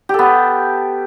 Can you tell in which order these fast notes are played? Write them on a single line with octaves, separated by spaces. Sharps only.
G4 A4 B3